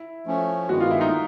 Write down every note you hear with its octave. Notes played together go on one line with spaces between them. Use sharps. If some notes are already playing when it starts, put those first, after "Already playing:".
Already playing: E4
F3 A3 C#4
G2 D#3 G#3 B3 F#4
F4
E4
D#4